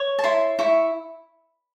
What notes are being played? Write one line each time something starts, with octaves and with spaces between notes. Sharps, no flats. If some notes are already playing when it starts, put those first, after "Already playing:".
Already playing: C#5
A5
E4 C6
E4 C#6